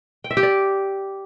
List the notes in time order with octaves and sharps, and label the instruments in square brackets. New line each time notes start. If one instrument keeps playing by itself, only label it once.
[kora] G5
E5
G4
D5